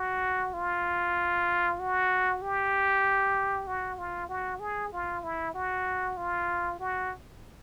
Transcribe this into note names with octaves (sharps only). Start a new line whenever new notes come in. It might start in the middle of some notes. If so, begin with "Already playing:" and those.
Already playing: F#4
F4
F#4
G4
F#4
F4
F#4
G#4
F4
E4
F#4
F4
F#4